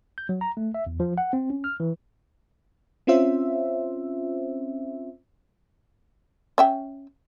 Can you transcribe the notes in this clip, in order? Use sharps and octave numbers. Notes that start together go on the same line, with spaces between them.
G6
F#3
A#5
A3
E5
E2
F3
F#5
C4
C#4
F6
E3
C4 C#4 F4 C5 E5
C#4 E5 G5